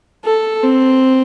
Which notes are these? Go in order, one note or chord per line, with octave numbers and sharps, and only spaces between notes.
A4
C4